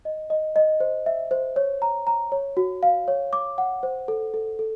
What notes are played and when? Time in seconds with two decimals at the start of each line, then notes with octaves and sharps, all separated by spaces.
0.05 D#5
0.30 D#5
0.56 D#5
0.80 C5
1.06 E5
1.31 C5
1.56 C#5
1.82 A#5
2.07 A#5
2.32 C#5
2.57 F#4
2.83 F5
3.08 C#5
3.33 D6
3.58 F#5
3.83 C5
4.08 A4
4.34 A4
4.59 A4